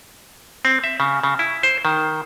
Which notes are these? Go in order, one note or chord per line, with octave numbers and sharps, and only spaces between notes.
C4
E5
C#3
C#3
E4
C5
D#3